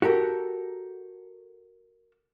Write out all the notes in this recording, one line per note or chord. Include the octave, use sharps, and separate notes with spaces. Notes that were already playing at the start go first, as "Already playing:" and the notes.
F#4 G4 A4 A#4